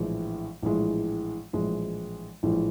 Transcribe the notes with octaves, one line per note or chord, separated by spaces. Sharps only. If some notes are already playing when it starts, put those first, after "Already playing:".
Already playing: A#1 A2 E3 G#3
A#1 A2 E3 G#3
A#1 A2 E3 G#3
A#1 A2 E3 G#3